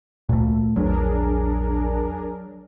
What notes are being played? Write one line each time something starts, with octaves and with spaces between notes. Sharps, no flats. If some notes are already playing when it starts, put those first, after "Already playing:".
D2 A#2 A3
A#1 E2 F#3 D4 G#4 A#4